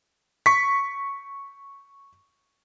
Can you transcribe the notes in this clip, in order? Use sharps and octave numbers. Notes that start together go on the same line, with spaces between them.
C#6 B6